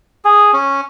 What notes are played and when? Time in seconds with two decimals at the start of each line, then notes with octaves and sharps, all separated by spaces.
0.25 G#4
0.53 C#4